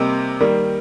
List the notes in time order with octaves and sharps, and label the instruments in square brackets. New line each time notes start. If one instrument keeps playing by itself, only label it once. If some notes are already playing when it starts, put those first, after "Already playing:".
Already playing: [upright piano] C3 G3 A#3 D#5 G5
D#3 G3 A#3